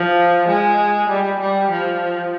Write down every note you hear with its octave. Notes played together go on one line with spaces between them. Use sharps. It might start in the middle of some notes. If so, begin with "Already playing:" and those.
Already playing: F3
G#3
G3
G3
F3